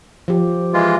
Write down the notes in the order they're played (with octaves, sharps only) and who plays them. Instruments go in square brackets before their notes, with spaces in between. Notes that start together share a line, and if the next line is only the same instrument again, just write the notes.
[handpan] F3 G4
[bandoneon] E3 G#3 F4